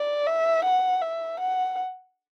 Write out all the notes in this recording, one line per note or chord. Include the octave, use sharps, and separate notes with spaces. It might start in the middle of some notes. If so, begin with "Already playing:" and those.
Already playing: D5
E5
F#5
E5
F#5